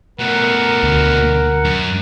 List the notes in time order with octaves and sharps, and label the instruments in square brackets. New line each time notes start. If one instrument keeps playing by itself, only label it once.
[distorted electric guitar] B2 A3 [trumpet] A#4 [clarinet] F#5
[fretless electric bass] D2
[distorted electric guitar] F#2